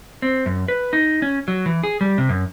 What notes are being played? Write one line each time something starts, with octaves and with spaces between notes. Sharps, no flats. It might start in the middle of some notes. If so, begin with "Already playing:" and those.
C4
F#2
B4
D#4
C#4
F#3
E3
G#4
G3
C3
F#2